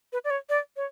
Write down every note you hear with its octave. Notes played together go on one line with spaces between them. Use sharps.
B4
D5
C#5
D5
C#5